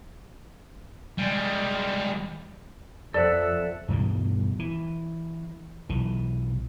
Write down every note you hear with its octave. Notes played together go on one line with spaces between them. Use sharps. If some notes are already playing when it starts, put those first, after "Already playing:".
G3 G#3
F2 A4 C5 D5 E5 F#5
G2 B2 E3 G3
E3
B1 E3